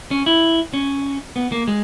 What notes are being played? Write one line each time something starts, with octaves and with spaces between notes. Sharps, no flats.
C#4
E4
C#4
B3
A#3
G#3